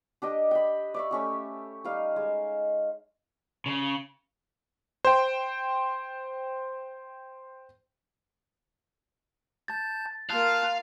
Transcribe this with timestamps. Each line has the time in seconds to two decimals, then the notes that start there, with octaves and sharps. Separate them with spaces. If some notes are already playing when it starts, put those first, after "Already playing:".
0.22 D4 G4 D#5
0.51 G5 B5
0.94 D5 E5 C#6
1.11 A3 C#4 G4
1.84 G3 D#4 F5
2.16 G#3
3.66 C#3
5.05 C5 G5
9.68 A5 G6 A6
10.30 A#3 F4 F5 A5 F6 F#6